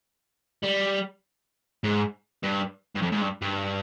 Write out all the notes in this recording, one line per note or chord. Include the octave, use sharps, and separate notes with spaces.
G3
G#2
G2
G2
F2
G#2
G2
G2